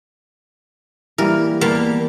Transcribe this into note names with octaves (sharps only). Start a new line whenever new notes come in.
E3 G3 A#3 A#4
E2 G3 A#3 D5 A5